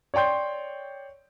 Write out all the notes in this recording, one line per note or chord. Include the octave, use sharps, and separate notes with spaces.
C#5 D5 G5 C6 G6